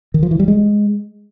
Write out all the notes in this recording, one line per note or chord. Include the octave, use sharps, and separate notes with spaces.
D#3
F3
E3
G3
G#3